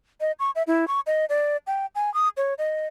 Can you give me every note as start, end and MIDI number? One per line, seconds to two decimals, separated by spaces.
0.21 0.32 75
0.39 0.51 85
0.56 0.63 76
0.67 0.88 64
0.88 1.00 85
1.07 1.25 75
1.29 1.57 74
1.67 1.86 79
1.95 2.13 80
2.14 2.29 87
2.37 2.54 73
2.58 2.87 75